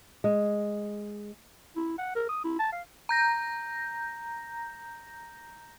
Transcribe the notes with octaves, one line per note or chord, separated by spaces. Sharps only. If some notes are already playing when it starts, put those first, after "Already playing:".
G#3
E4
F#5
A#4
D#6
E4
A5
F5
A#5 G6 A#6